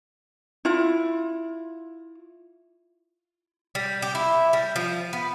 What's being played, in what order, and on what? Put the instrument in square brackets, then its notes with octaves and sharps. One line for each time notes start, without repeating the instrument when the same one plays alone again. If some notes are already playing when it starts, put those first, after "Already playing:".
[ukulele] E4 F4
[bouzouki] G3
G4
E4
G3
F3
B3